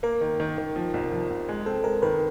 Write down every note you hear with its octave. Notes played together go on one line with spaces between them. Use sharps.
A#3 A#4
D#3
D#3
D#3
F3
C2
F3
C2
G#3
C4 A4
G#3 A#4
D#3 B4